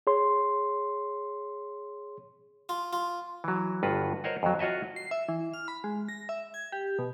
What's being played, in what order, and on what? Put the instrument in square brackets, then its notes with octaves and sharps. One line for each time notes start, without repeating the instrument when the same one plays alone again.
[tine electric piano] G#4 C#5 C6
[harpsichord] F4
F4
[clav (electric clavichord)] E3 F#3
G1 G2 F4 F#4 B4
A#4 C5 C#5 D#5 F#5
F2 F#3
F4 F#4 C#5 D#5 E5
[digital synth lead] C7
E5
E3
F6
B5
G#3
A#6
E5
G#6
G4
B2